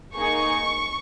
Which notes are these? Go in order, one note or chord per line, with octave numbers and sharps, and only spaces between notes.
A#3 D#4 G#4 C#6